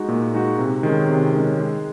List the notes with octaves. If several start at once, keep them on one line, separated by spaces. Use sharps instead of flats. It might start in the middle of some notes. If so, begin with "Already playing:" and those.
Already playing: G#3 D#4 F#4
A#2
G#3 D#4 F#4
C3
D#3 G#3 C#4
C3
D#3 G#3 C#4
G#3